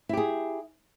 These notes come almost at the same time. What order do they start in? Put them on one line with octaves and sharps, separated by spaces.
E4 G4 G#4